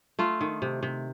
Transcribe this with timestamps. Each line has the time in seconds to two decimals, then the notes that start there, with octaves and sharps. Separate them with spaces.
0.19 A3 F4
0.41 D#3
0.62 C3
0.83 C3